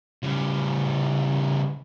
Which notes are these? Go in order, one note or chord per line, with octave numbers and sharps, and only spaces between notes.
C#3 G3